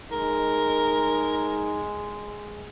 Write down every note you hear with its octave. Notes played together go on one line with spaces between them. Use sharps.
G#3 D#4 A#4